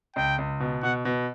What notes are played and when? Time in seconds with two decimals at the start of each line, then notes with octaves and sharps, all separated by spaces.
0.16 C#2 G5
0.38 C#2
0.60 B2
0.83 B2 F#5
1.05 B2